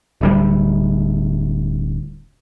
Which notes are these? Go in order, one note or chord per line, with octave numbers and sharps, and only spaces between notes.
D1 D2 G3